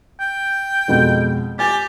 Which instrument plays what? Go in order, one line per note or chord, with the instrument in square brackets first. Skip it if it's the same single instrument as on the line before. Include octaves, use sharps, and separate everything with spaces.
[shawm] G5
[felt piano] F2 B2 G#3
[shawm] G4 [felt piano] G#5 A6